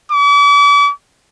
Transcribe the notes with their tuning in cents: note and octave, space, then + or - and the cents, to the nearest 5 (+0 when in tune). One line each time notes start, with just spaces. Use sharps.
D6 -40